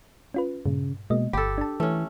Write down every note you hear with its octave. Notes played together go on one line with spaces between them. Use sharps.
C#4 F4 B4
G2 A#2 C#3
B2 G#3 A#3 D#5
G1 G4 A4 B5
D4 A5
E3 A3 C#4